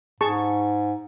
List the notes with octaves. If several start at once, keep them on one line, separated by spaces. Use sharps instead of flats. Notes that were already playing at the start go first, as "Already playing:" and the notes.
G#2 G#4 A5 C#6